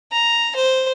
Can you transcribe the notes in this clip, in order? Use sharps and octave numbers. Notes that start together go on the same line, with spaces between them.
A#5
C5